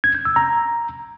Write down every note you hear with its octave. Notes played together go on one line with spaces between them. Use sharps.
G#6
G6
E6
A#5